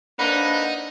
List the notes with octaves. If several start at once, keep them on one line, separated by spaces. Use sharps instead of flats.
A#3 C4 D4 D#4 B4 F#5 B5